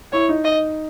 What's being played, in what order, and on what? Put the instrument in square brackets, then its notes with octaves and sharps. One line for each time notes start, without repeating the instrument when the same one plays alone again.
[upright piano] E4 [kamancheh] C#5
[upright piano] D#4
[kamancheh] D#5